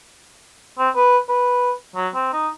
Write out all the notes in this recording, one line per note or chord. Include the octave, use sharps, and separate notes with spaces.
C4
B4
B4
F#3
C4
D#4